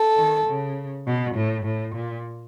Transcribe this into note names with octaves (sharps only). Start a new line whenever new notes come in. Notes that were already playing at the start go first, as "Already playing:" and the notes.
Already playing: A4
D#3
C#3
B2
A2
A2
A#2